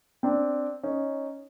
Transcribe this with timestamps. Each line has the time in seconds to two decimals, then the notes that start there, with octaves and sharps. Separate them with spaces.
0.23 C4 D4
0.83 C#4 D#4